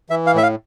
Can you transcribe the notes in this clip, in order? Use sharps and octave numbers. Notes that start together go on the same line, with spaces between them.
E3 E5
F5
A2 E5
F5